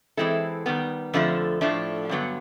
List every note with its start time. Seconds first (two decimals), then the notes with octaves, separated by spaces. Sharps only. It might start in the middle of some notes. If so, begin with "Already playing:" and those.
0.17 E3 G#3 C4 E4 A4
0.66 D#3 G3 B3
1.14 F2 D3 F3 A3
1.61 A2 F3 A3 D4
2.09 G2 D3 F#3 B3